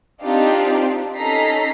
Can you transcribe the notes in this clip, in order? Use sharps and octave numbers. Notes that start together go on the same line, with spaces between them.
C4 D4 D#4 F4 G4
C#4 D#4 A4 A#5 B6 C7